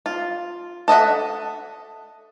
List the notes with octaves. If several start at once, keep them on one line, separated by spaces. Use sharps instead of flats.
F4
A4 D#5 E5 F#5